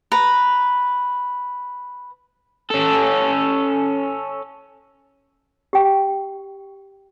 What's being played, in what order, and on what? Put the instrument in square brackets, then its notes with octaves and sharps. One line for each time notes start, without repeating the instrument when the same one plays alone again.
[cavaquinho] B4 A#5
[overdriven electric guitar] C#4 A4
[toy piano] G4 G5